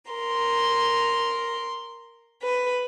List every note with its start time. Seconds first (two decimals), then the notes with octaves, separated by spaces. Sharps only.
0.10 A#4 C6
2.42 B4